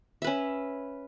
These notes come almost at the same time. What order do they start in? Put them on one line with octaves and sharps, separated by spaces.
E5 B4 C#4